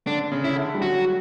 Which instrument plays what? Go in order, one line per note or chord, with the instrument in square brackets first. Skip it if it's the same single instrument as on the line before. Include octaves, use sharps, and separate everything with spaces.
[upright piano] D3 [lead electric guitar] D4
[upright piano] C#3
[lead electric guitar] E4
[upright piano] D3
G3
[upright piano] F#3 [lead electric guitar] F#4